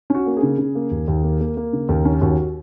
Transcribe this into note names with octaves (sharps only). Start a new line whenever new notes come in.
C#4 F#4
A#3
G#4
C#3
C#3
A#3
D#2
D#2
A#3
A#3
A#3
C#3
D#2 A#4
C#4
D#2 F#4